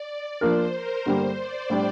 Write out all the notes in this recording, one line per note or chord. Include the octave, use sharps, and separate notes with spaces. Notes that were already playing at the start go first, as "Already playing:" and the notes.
Already playing: D5
F3 A#3 D4 F4 A#4 C5
A#4
G2 D3 G3 A#3 C5
D5
A2 G3 D4